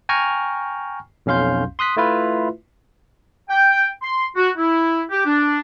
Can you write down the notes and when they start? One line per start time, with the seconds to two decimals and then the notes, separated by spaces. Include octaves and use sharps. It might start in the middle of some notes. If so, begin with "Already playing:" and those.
0.09 G5 G#5 A#5 C#6 F6
1.26 B1 F2 C#4 F5 C6 G6
1.79 C6 D#6 F#6 B6
1.97 A3 E4 F4 B4 E5
3.49 G5
4.02 C6
4.36 F#4
4.57 E4
5.10 G4
5.25 D4